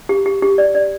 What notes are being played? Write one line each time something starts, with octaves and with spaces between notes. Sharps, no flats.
G4
G4
G4
D5
D5